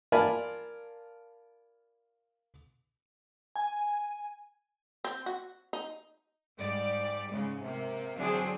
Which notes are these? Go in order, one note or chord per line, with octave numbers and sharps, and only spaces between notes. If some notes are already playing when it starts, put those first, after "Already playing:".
F4 A#4 D5 G#5 A5 B5
G#5
C4
F#4
D#4
G#2 G3 D5
G#2 C#3 G#3
C3 A#3
D3 E3 F#3 C4 D4 G#4